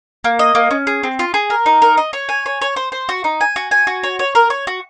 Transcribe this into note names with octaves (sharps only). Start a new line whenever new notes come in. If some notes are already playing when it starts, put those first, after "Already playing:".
A#3
D#5
A#3
C#4
G#4
C4
F4
G#4
A#4
D#4
A#4
D#5
C#5
G#5
C#5
C#5
C5
C5
F#4
D#4
G#5
F#4
G#5
F#4
C#5
C#5
A#4
C#5
F#4